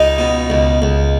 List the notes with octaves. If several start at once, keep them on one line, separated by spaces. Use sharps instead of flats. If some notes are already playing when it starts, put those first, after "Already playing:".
Already playing: C#2 D#4
B2
C#2
C#2